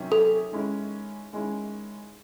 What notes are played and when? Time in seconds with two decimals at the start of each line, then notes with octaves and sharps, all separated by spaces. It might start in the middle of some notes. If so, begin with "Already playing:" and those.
Already playing: C3 D#3 F#3 C#4
0.12 A4
0.51 D#3 G#3 C#4 E4
1.33 D#3 G#3 C#4 E4